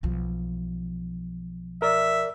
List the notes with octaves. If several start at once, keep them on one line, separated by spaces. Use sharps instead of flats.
B1 F3
A#4 D5 E5